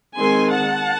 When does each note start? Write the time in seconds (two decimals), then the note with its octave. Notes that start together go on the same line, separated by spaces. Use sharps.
0.18 D#3 G#3 C4 G#5 C6
0.50 F#5 A5